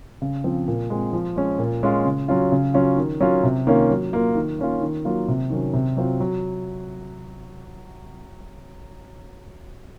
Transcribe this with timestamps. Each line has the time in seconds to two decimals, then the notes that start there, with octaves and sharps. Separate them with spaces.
0.22 C#3
0.44 F3 C4
0.68 A#2
0.90 G#3 C4
1.13 F3
1.36 G#3 C#4
1.59 A#2
1.83 G#3 C#4 F4
2.05 C#3
2.28 F#3 C#4 F4
2.52 C#3
2.74 F#3 C#4 F4
2.97 D#3
3.20 F#3 C#4 F4
3.43 C3
3.67 D#3 A#3 C#4 F4
3.90 F#3
4.13 A#3 F4
4.36 D#3
4.59 A#3 C#4 F4
4.81 D#3
5.05 F#3 A#3 F4
5.28 C3
5.50 D#3 F#3 C#4
5.73 C3
5.97 F#3 C4 F4
6.20 F#3